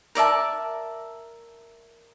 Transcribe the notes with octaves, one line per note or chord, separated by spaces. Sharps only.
A#4 D5 E5 A5